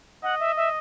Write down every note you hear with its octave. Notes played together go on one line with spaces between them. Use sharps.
D#5 F#5
E5
E5